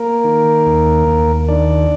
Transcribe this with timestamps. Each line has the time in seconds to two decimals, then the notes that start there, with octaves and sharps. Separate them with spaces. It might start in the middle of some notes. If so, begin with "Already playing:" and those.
Already playing: A#3 A#4
0.24 D#3
0.66 D#2
1.07 D#2
1.48 D#3 D4 D5